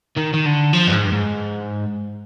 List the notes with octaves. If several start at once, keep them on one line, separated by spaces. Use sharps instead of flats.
D#3
D#3
D3
F3
G2
G#2
G2
G#2